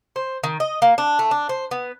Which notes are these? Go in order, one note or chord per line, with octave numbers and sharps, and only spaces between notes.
C5
D#3
D#5
A#3
D4
A3
D4
C5
B3